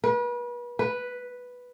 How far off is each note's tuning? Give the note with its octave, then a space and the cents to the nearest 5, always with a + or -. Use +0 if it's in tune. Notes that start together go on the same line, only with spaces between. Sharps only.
B4 -35
B4 +0